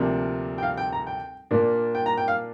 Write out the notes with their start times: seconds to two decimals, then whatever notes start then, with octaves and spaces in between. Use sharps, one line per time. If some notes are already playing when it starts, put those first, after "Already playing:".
Already playing: D2 C3 F3 A#3 D4
0.58 G5
0.63 F5
0.77 G5
0.92 A#5
1.07 G5
1.51 A#2 A#3 D4
1.95 G5
2.06 A#5
2.18 G5
2.28 F5